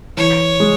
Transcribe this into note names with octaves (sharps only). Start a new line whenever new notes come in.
E3 C#5
G#3